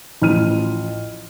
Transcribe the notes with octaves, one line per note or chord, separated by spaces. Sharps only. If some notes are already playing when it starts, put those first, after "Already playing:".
A1 F3 F6 D#7